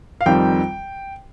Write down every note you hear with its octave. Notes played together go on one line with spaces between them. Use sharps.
F5
F2 D#3 G3 C4 G5